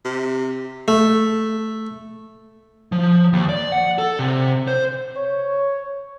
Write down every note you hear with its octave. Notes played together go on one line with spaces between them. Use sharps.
C3
A3
F3
D#2
D5
F#5
A4
C3
C5
C#5